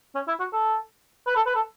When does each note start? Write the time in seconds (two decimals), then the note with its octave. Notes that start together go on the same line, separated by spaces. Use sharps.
0.15 C#4
0.28 E4
0.40 F#4
0.53 A4
1.27 B4
1.36 A4
1.46 B4
1.55 A4